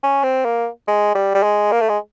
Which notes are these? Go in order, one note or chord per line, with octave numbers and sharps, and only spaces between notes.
C#4
C4
A#3
G#3
G3
G3
G#3
A#3
A3
G#3